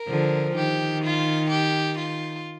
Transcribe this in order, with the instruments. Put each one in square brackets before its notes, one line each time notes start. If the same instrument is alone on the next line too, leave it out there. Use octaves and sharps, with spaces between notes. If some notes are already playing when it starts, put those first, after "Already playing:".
Already playing: [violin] A#4
[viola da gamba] D3 F3
[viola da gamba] D#3 [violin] G4
[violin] F4
G4
F4